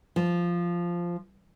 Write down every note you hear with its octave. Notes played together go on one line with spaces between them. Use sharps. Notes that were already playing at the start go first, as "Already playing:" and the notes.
F3